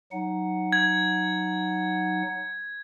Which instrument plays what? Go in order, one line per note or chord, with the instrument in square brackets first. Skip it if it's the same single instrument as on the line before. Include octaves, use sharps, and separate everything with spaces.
[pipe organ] F#3 D#4 F#5
[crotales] G#6